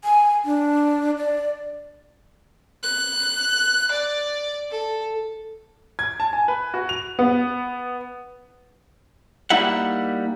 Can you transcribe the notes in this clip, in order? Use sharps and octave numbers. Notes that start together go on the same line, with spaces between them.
G#5
D4
D5
F#6
D5
A4
G#6
A5
G#5
B4
F#4
F7
B3
G3 A#3 D#4 E4 E5 F#5